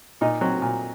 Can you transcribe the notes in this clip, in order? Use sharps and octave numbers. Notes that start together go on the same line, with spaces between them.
A#2 D#4
F#3 C4
A#2